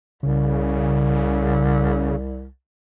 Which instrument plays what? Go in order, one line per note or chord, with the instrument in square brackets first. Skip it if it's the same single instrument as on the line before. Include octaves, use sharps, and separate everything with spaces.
[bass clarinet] C2 [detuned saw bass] C#3